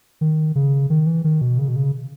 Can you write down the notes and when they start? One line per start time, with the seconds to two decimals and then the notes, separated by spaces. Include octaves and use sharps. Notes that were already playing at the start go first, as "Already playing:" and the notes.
0.21 D#3
0.55 C#3
0.90 D#3
1.07 E3
1.24 D#3
1.41 B2
1.59 C#3
1.68 B2
1.76 C#3